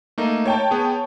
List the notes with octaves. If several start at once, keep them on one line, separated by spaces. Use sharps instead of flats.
A3 A#3 D#4
C#5 G5 A5
B3 G#4